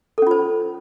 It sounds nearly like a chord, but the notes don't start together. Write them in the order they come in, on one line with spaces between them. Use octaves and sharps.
A4 C#4 F4 C5